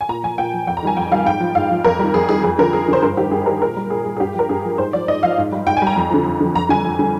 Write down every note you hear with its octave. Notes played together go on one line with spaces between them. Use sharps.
G#5
A#2 A#5
F3 G#5
A#2 G5
F3
F2 G5
A#5
D#3 G3 G#5
F2 G5
D#3 G3 F5
G#2 G5
F3
G#2 F5
F3
F2 A#4
D#3 G3
F2 G#4
D#3 G3 G#4
F2 G#4
D3 F3 A#4
F2 G#4
D3 F3 C5
G2 A#4
D#3 G3 G4
G2 G#4
D#3 G3 A#4
A#2 A#4
G3
A#2 G#4
G3
G#4
G2 G4
F3 A#4
G2 G#4
F3
G#2 C5
F3 D5
G#2 D#5
F3 F5
G#2
G3
G#2 G5
G#5
G3
A#5
F2
D3 F3
F2
D3 F3
F2 A#5
D3 G3 G#5
F2
D3 G3